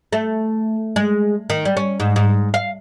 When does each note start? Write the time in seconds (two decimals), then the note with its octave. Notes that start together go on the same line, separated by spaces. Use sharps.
0.13 A3
0.96 G#3
1.50 D#3
1.65 G3
1.77 C#4
2.00 G#2
2.16 G#2
2.54 F5